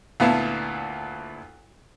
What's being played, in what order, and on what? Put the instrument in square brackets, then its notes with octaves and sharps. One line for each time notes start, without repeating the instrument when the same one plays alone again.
[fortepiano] D2 A#2 B3 E4 F5 A5